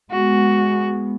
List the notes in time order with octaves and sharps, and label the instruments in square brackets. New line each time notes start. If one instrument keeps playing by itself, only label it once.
[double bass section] G#3 B3 [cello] F#4